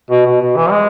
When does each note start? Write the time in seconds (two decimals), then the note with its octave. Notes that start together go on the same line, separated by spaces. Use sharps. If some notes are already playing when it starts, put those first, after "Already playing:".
0.11 B2
0.26 B2
0.41 B2
0.57 E3
0.71 G#3